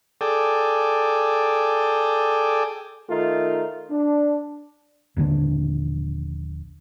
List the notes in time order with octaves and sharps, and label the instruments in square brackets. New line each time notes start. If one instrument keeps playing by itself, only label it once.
[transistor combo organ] G#4 A4 D5 G5
[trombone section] D#3 A3 D#4 F4 A#4
D4
[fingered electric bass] D#1 A#1 D3 D4